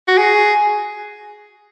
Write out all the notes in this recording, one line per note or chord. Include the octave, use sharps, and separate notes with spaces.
F#4
G#4